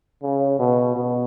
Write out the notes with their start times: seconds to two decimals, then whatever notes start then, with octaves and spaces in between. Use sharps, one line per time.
0.22 C#3
0.59 B2
0.96 B2